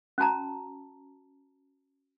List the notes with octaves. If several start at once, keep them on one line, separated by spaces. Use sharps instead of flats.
C#4 F#4 A5 A#5